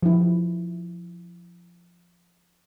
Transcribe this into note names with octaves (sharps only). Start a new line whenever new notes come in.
F3 E4